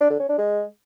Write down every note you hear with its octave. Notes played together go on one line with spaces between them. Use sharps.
D4
D3
C#4
D4
G#3